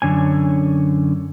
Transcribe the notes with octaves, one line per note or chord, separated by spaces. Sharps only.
F#2 D3 C#4 G#5